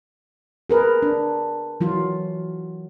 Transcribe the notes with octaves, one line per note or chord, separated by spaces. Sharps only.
G#4 A#4 B4
D4
E3 F#3 F4